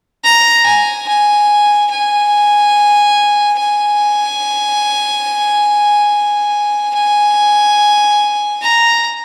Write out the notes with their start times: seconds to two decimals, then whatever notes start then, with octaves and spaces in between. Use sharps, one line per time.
0.24 A#5
0.66 G#5
1.08 G#5
1.91 G#5
3.59 G#5
6.95 G#5
8.62 A#5